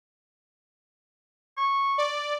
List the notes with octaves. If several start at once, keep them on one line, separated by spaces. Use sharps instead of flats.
C#6
D5